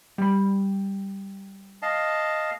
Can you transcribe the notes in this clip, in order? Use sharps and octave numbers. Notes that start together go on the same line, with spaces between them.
G3 B5
D#5 F5 A5